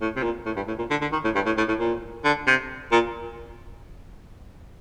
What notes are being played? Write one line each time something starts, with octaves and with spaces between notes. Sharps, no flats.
A2
C3
A#2
A2
G2
A2
A#2
D3
D3
D#3
A2
G2
A2
A2
A2
A#2
D3
C3
A#2